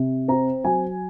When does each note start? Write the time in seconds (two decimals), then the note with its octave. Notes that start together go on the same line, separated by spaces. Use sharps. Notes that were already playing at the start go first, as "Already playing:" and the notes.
Already playing: C3
0.28 C4 A#5
0.64 F#3 G#5